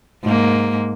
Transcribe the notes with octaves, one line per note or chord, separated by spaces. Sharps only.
G#2 A#3